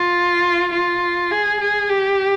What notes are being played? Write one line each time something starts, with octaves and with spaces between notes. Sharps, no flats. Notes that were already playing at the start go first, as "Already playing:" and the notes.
Already playing: F4
F4
G#4
G#4
G4